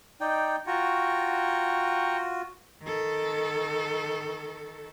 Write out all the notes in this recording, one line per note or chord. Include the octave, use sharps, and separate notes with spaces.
D#4 D5 G5
F4 F#4 G5 A#5 C#6
D#3 A4